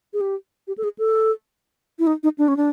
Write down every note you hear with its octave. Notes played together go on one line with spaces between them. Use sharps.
G#4
G4
G4
A4
G#4
A4
E4
D#4
D#4
D4
C#4
D4